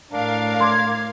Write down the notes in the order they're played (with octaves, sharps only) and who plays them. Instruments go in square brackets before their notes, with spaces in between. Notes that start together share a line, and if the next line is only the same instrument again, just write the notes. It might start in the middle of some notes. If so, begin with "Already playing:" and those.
[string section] A2 A#4 F5 [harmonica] D4
[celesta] C6 [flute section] D6 G#6